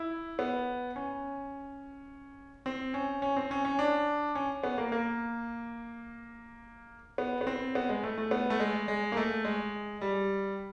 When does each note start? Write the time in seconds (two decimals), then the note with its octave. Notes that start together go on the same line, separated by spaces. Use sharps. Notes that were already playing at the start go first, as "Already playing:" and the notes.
Already playing: E4
0.39 B3
0.96 C#4
2.66 C4
2.94 C#4
3.22 C#4
3.36 C4
3.51 C#4
3.65 C#4
3.79 D4
4.35 C#4
4.63 B3
4.78 A#3
4.92 A#3
7.18 B3
7.41 B3
7.47 C4
7.75 B3
7.89 G#3
8.03 A3
8.17 A3
8.31 B3
8.50 A3
8.60 G#3
8.88 G#3
9.12 A#3
9.17 A3
9.45 G#3
10.01 G3